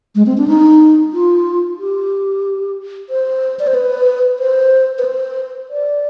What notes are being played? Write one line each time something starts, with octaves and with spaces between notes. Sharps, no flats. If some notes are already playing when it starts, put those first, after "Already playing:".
G#3
C4
D4
D#4
F4
G4
C5
D5
C5
B4
C5
B4
C5
D5